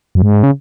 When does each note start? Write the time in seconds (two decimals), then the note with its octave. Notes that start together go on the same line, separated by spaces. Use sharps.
0.15 F#2
0.22 G#2
0.43 C#3